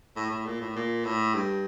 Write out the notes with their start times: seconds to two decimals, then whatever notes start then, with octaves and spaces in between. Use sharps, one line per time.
0.16 A2
0.31 A2
0.46 A#2
0.61 A2
0.76 A#2
1.05 A2
1.35 G2